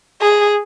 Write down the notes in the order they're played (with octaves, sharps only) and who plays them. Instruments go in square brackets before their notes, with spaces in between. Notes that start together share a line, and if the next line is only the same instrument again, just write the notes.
[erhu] G#4